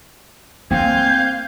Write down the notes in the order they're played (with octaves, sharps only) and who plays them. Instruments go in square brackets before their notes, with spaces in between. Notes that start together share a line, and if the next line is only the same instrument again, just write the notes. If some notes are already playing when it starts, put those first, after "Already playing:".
[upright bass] A#3 [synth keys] C4 [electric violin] F5 G6 [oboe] G#5